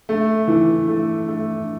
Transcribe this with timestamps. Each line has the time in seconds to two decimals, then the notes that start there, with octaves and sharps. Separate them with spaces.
0.09 A3
0.48 E3
0.88 A3
1.28 A3